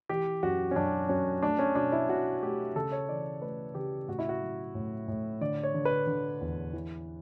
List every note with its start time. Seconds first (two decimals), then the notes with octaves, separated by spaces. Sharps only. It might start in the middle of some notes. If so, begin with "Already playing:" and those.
0.09 E3 G4
0.43 F#2 F#4
0.71 C#4
0.76 F#2 D4
1.09 F#2 C#4
1.43 A3 D4
1.59 C#4
1.75 B2 D4
1.92 E4
2.09 B2 F#4
2.42 A3 G4
2.76 C#3 A4
2.92 C#5
3.09 E3 D5
3.42 A3 B4
3.75 C#3 G4
4.08 A2 F#4
4.19 E4
4.29 F#4
4.41 F#3
4.75 A2
5.08 A2
5.41 D3 D5
5.63 C#5
5.74 D3
5.85 B4
6.07 D3
6.41 E2
6.73 E3